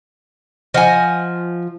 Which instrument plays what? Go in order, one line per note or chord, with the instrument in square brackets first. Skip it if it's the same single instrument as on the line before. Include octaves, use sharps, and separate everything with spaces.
[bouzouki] F3 [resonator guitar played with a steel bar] D#5 F#5 G#5